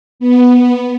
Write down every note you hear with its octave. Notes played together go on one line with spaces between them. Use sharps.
B3